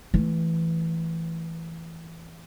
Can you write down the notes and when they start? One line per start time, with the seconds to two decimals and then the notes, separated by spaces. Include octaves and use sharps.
0.14 E3 A3